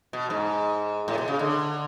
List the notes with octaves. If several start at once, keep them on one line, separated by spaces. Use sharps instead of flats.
B2
G#2
A2
B2
C#3
D3